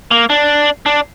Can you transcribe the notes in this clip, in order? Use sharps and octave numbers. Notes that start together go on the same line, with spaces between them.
A#3
D4
D4